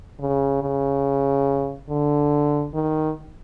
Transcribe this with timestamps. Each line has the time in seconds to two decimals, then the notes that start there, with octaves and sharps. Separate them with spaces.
0.20 C#3
0.62 C#3
1.89 D3
2.74 D#3